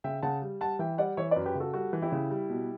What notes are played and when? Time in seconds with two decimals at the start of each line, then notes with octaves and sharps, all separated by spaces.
0.04 C#3 E5 G5
0.23 C#3 F#5 A5
0.42 G3
0.61 G3 F#5 A5
0.79 E3 E5 G5
0.98 G3 D5 F#5
1.17 E3 C#5 E5
1.31 F#2 B4 D5
1.46 G4 B4
1.55 C#3
1.60 F#4 A4
1.74 G3 F#4 A4
1.93 E3
2.02 E4 G4
2.12 C#3
2.31 G3
2.50 B2